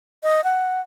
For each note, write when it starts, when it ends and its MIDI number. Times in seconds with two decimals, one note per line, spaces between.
0.23 0.44 75
0.44 0.81 78